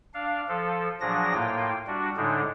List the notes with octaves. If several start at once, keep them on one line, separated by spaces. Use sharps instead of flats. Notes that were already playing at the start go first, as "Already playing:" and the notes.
D4 F5
F3 A4
A#2 F3 F#3 D4 G#4 A#6
A2 A#3 F4 G5
G3 D4 F#4
A2 D3 G#3 D4 D#4